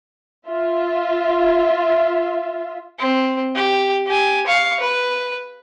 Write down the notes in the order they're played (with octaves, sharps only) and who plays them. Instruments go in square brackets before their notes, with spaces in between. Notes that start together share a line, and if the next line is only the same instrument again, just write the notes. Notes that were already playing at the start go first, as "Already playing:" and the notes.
[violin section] F4 E5
[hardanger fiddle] C4
G4
G4 G#5
F5 C#6
B4